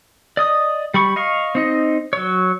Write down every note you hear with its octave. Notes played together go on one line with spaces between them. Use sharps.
D5 D#5 D#6
G3 B5 C#6
D#5 F5 C#6
C4 D#4 D#5
F#3 C#5